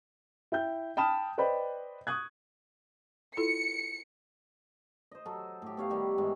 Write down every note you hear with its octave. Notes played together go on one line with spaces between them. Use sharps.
E4 G5 G6
G5 A5 B5 D#6 F6 E7
B4 C5 D5 D#5 G5 B5
C#6 D#6 F#6 G#6
E4 F4 A4 C#7
C5 D#5
F#3 A4
A2 G4
B3 C#5 F5
D#3 G3 E4
G#2 E3 G#3